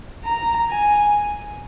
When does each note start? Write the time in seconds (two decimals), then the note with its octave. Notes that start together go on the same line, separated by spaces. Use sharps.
0.25 A#5
0.70 G#5